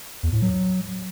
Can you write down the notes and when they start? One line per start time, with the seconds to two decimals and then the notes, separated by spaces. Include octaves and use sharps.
0.23 E2
0.32 A2
0.42 F#3